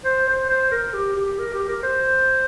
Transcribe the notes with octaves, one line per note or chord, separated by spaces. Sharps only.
C5
C5
C5
A#4
G4
G4
A#4
G4
A#4
C5